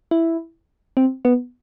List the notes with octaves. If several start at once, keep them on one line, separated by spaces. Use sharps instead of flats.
E4
C4
B3